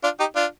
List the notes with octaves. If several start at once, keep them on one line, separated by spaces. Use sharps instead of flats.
D4 F4
D#4 G4
D4 F4